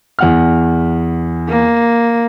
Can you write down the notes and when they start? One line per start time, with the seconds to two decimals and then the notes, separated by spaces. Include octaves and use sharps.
0.19 E2 F#5 F6
1.48 A#3